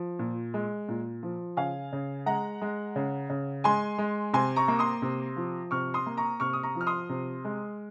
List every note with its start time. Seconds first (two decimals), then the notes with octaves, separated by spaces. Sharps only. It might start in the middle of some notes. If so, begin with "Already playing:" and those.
Already playing: F3
0.19 A#2
0.54 G#3
0.88 A#2
1.23 F3
1.57 C#3 F5 G#5
1.92 C#3
2.26 G#3 F#5 A#5
2.61 G#3
2.96 C#3
3.30 C#3
3.64 G#3 G#5 C6
3.98 G#3
4.33 C3 G#5 C6
4.56 A#5 C#6
4.68 A#3
4.79 C6 D#6
5.02 C3
5.36 F3
5.71 C3 C#6 F6
5.94 C6 D#6
6.06 A#3
6.17 A#5 C#6
6.40 C3 C#6 F6
6.53 D#6
6.63 A#5 C#6
6.75 F3
6.81 F6
6.87 C6 D#6
7.09 C3
7.45 G#3